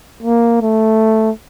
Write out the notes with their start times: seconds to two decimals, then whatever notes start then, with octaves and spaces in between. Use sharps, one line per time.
0.22 A#3
0.61 A3